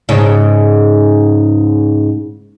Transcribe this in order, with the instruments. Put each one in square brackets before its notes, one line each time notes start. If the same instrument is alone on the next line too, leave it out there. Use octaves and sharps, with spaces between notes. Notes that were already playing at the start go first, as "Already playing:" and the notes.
[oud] G#2 C#3